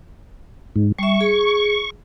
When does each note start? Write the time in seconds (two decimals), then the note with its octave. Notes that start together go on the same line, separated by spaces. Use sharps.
0.76 G#2
0.99 G3 E5 C#6
1.21 G#4